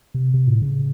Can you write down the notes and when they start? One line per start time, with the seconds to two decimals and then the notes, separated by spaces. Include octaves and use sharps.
0.14 C3
0.34 C3
0.47 A2
0.62 C#3